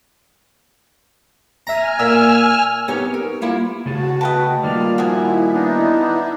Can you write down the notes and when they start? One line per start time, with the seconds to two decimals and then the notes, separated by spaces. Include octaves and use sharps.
1.67 E5 G#5 A#5 F6
1.99 A#2 E6
2.88 B3 C4 D#4 G4 C#5
3.14 A#4
3.41 G3 A#3 E4 F4
3.86 C#3 A3 F#4 G#4 A5
4.21 B4 D#5 G5 A5
4.63 D#3 G3 A#3 F4 D5 F6
4.98 A#2 F3 E4 F#4 D#5 G#5
5.53 B3 D4 D#4